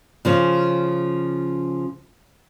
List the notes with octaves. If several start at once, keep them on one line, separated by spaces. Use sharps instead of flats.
C#3 F3 C#4